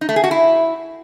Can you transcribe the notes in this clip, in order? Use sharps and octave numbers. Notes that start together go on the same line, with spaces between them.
D#4
A3
G#4
F#4
E4